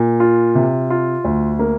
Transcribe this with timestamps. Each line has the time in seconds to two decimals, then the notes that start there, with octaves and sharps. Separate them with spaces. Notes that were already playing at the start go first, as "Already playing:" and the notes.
Already playing: A#2
0.20 F4
0.55 C3
0.90 F4
1.25 D2
1.59 A#3